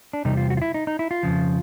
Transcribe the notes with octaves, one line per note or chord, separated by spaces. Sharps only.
D4
E2 C3 G3 D#4
F4
F#4
F4
E4
D#4
D#4
E4
F4
F2 C#3 F3